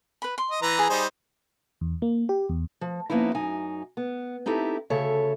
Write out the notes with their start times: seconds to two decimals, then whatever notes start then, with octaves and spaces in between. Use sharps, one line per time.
0.22 B4 B5
0.38 C6
0.51 D#5
0.62 E3 B4 A#5
0.78 G#4 D#6
0.90 G3 D#4 C5
1.81 E2
2.02 A#3
2.29 G4
2.49 E2
2.81 F3
3.10 F3 A#3 B3 C#4 D#4 E4
3.35 F#2 D#4 G#5
3.97 B3
4.46 C4 D#4 E4 G4 A4
4.90 D2 C#3 A4 C#5 E5